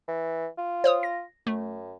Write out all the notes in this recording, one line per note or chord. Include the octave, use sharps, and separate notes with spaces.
E3
F4
C5 C#5 D#6
A#6
F#2 A3